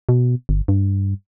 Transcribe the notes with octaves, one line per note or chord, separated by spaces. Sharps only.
B2
G1
G2